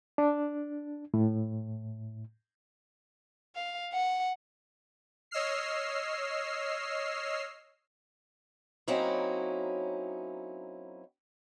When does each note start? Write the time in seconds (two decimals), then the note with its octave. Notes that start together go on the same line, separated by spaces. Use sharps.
0.18 D4
1.14 A2
3.56 F5
3.93 F#5
5.31 C#5 D#5 E6 F6 C7
8.88 F#3 A#3 C4 C#4 D#4 E4